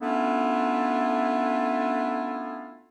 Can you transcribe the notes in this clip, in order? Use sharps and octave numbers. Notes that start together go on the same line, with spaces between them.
A3 B3 C#4 D4 E4 F4